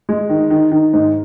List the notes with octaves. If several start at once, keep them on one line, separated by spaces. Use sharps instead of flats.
G#3
D#3
D#3
D#3
G#2